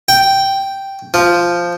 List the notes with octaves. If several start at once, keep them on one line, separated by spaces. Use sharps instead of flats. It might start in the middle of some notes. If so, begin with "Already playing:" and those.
G5
F3